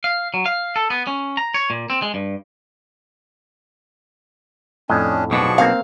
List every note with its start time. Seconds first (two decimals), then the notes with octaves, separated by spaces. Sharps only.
0.04 F5
0.34 F#3
0.46 F5
0.76 A4
0.90 B3
1.07 C#4
1.37 A#5
1.54 C#5
1.70 A#2
1.90 C4
2.02 G#3
2.14 G2
4.89 F2 A2 C#4 D4 D#5
5.31 B1 B2 F3 D4 G#4 C#6
5.58 A#3 C4 F5